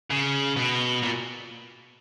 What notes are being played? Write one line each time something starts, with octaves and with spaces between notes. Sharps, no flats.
C#3
B2
A#2